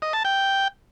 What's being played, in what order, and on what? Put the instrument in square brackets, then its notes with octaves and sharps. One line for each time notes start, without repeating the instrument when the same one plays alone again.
[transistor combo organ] D#5
A5
G5